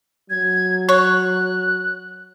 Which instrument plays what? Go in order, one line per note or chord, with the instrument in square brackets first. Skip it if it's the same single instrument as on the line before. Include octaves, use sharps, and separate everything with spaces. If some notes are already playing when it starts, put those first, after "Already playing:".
[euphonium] F#3 [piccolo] G#6
[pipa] C#5 [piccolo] F#6